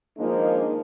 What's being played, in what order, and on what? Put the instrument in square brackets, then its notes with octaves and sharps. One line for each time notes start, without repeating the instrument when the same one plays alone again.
[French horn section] D#3 F3 G#3 A#3 D4 D#4